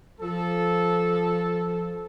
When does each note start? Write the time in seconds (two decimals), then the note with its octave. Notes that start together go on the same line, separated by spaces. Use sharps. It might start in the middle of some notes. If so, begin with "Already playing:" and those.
0.21 F3 A4